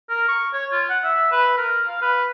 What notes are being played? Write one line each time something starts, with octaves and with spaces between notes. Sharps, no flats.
A#4
C#6
C#5
F4
F#5
E5
B4
A#4
F5
B4